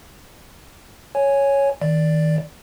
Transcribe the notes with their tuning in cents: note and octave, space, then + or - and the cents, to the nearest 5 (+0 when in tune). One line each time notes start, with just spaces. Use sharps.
C#5 +0 G#5 +0
D#3 +30 D5 +0